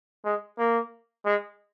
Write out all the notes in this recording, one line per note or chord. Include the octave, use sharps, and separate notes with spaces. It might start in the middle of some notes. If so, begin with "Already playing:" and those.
G#3
A#3
G#3